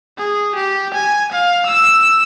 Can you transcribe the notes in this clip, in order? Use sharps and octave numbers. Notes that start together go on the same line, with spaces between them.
G#4
G4
G#5
F5
E6